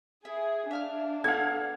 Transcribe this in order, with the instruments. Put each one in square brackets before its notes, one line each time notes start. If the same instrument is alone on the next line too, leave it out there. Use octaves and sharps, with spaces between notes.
[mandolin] E4 [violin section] G#4
[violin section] D4 [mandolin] E5 F5 F6
[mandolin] B3 [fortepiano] A4 F#5 [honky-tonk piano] F5 G#6